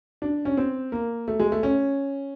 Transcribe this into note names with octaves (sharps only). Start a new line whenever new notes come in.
D4
C#4
C4
A#3
A3
G#3
A3
C#4